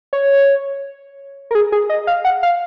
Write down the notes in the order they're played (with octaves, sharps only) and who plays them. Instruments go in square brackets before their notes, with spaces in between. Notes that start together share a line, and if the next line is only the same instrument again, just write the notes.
[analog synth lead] C#5
A#4
G#4
G#4
D#5
F5
F#5
F5